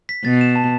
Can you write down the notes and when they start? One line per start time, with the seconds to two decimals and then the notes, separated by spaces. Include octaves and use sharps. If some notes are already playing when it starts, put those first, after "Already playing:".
0.09 B6
0.25 B2 A6
0.41 E7
0.56 A5